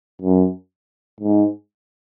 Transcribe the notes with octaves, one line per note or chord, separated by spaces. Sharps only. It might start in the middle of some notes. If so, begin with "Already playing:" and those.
F#2
G#2